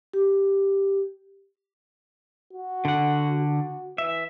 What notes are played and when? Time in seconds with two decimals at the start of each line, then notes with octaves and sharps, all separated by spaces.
0.13 G4
2.53 F#4
2.85 D3 F#5
3.39 F#4
3.98 E3 E5